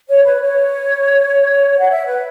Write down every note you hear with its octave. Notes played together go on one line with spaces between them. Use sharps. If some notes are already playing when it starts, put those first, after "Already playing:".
C#5
B4
C#5
F#5
E5
B4